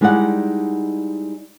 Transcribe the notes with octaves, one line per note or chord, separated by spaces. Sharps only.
G3 G#3 D#4 E4 D5 F#5